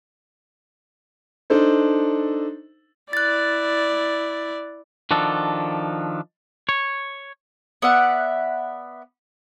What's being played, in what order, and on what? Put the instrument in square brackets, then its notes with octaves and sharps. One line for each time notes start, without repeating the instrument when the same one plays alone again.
[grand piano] D4 D#4 A4 C5
[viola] E4 D5 [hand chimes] F#6 A6
[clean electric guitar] D#3 F3 D4 F#4 A4
C#5
[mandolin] B3 D5 E5 F#5